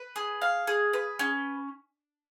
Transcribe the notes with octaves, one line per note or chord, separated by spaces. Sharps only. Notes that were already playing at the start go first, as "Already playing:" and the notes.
Already playing: B4
G#4
F5
G#4
B4
C#4